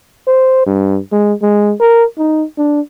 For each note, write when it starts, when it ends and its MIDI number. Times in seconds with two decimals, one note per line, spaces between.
0.27 0.62 72
0.66 0.99 43
1.12 1.33 56
1.42 1.74 56
1.80 2.04 70
2.18 2.44 63
2.58 2.80 62